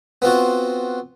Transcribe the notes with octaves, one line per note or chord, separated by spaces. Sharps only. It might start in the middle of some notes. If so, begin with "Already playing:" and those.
B3 C4 F4 F#4